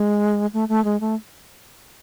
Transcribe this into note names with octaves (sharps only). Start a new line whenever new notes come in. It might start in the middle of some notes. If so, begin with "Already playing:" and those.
Already playing: G#3
A3
A3
G#3
A3